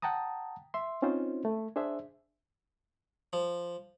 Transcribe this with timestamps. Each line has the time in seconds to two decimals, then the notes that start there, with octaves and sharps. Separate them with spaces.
0.02 F#5 G5 A5 A#5 D#6
0.74 E5 C6
1.02 C4 C#4 D#4 F4 C5
1.45 A3
1.76 D4 G#4 C5 E5
3.33 F3